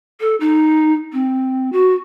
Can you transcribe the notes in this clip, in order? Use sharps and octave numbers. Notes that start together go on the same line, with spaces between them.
A4
D#4
C4
F#4